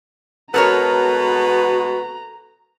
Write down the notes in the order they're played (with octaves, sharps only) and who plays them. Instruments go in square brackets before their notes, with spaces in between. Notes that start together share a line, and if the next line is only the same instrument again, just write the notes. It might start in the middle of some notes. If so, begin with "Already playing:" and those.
[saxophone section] B2 G#3 B3 [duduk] F#4 [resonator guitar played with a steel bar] A4 A#4 C#5 [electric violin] A#5